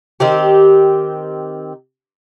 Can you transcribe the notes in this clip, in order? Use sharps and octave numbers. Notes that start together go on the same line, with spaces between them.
D#3 C4 G4